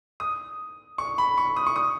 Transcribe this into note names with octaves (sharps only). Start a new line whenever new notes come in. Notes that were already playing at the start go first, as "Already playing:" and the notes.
D#6
C#6
B5
C#6
D#6
C#6
D#6